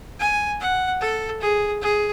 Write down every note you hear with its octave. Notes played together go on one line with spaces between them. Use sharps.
G#5
F#5
A4
G#4
G#4